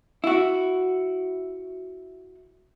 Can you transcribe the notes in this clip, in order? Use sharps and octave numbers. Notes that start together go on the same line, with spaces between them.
E4 F#4